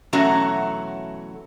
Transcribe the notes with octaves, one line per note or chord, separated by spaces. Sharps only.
E2 B2 F#3 A3 C#4 F#4